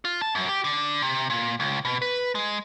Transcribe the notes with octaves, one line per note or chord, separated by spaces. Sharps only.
F4
A5
F#2
G4
D3
C3
A#2
C#2
B2
B4
G#3